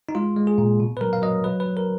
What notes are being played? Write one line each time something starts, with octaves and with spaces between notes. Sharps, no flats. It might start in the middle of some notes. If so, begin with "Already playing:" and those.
D#4
G#3 F4
G#3
G#4
A#2
B2
B4
F#3 A#4
F5
F#3 D#5
F#3 B4
B4
F#3
A#4